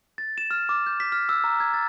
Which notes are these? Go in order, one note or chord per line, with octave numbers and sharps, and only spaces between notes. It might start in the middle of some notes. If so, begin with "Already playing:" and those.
A6
E7
F6
D6
G6
B6
F6
E6
A#5
G#6
A6